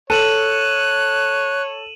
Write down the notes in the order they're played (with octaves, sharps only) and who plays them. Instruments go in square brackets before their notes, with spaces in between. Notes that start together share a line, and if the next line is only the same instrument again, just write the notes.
[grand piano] A4 [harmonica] C#5 [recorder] F#6 [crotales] D#7 E7 F#7